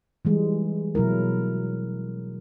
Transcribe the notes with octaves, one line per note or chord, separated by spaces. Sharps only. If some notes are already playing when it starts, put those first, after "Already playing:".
E3 G3 G#3
B2 F#3 E4 A#4